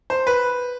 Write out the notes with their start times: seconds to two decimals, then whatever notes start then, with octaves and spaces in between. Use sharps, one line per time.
0.10 C5
0.27 B4